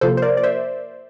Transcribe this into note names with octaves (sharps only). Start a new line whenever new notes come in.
C3 F3 A#3 F4 A4 C5
C5
A#4 D5
D5
C5 E5